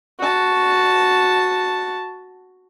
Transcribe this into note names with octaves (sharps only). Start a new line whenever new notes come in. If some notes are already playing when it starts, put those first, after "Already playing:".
F#4 A5